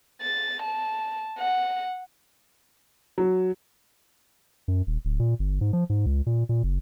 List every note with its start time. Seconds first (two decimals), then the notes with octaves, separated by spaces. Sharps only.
0.22 A6
0.62 A5
1.39 F#5
3.18 F#3
4.68 F#2
4.87 D#1
5.05 D1
5.19 A#2
5.39 G1
5.61 G#2
5.73 F3
5.90 G#2
6.06 C#2
6.26 A#2
6.49 A#2
6.63 F#1